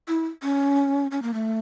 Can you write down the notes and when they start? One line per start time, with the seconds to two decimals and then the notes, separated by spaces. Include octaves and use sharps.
0.08 E4
0.43 C#4
1.11 C#4
1.22 A#3
1.34 A3